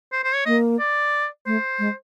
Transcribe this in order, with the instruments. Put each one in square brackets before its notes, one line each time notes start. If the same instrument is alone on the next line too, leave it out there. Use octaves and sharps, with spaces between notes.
[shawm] C5
C5
C#5
[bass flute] A#3 [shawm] D#5
[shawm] D5
[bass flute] A3 [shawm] C5
[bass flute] G#3